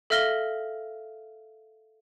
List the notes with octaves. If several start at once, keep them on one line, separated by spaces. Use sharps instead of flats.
A4 E5 F5 F6 A#6 G7